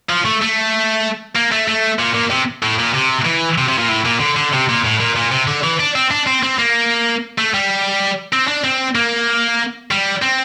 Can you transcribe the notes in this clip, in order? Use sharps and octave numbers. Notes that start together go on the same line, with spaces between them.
F3
A3
A3
A#3
A3
A3
A#2
A#2
C3
A2
A#2
C3
E3
C3
C3
A#2
A2
A#2
D3
D3
C3
A#2
A2
A#2
A#2
C3
D3
E3
D4
C4
D4
C4
C4
A#3
A3
G3
C4
D4
C4
A#3
G3
C4